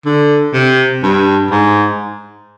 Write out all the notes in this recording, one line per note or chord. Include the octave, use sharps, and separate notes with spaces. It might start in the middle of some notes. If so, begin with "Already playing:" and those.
D3
C3
G2
G#2